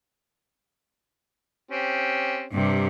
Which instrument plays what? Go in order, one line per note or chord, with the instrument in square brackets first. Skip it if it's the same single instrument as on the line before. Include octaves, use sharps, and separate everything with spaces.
[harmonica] C4 C#4 G4
[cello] G2 C3